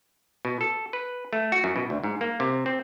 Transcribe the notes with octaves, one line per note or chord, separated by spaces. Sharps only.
B2
A4
B4
A3
F#4
F#2
B2
D2
G#2
A#3
C3
C4